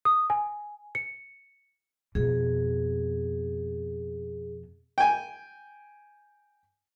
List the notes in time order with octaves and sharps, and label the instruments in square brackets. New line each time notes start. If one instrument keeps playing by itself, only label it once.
[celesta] D#6
G#5
C#7
[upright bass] F2 B2 [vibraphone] G#4
[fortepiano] G5 G#5